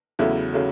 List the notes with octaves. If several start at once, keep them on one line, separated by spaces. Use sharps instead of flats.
E2 C#3 F#3 A3 E4
C#3 F#3 A3